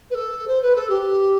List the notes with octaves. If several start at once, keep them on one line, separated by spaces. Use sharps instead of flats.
B4
A4
C5
B4
A4
G4